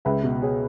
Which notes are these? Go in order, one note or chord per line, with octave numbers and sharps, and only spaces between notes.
C#2 B4 E5
B2
G#4 C#5